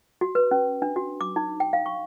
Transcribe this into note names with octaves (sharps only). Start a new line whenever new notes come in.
F#4
B4
C#4
D4
F#4
D6
D#4
G5
F5
C#6